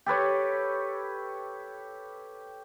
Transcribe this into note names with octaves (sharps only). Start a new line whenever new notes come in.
G4 A4 B4 C#5